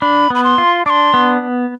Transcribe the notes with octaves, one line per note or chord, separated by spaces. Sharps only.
D4 B5
B3 B5
C6
F4
D4 C6 D6
B3